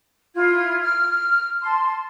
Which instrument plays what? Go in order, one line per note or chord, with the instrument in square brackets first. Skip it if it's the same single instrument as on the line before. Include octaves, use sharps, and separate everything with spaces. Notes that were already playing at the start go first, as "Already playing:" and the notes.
[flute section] E4 F4 G#6
F6
A5 C6